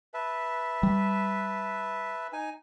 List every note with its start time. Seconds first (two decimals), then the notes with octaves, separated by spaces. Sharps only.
0.14 B4 E5 A5
0.83 G3
2.33 D#4 G#5